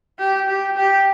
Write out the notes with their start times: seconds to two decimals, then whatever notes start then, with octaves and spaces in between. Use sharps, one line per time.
0.19 G4
0.48 G4
0.77 G4